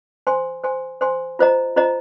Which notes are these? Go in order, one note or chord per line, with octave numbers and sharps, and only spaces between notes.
C5 G#5 C6
C5 G#5 C6
C5 G#5 C6
F4 C5 D#5 A#5
F4 C5 D#5 A#5